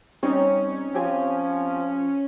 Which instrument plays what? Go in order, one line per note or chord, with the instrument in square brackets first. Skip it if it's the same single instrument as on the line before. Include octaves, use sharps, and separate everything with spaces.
[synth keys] G3 C4 D#4 [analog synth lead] C#4 [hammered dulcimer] C#5
[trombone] F3 [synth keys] C4 G4 G#5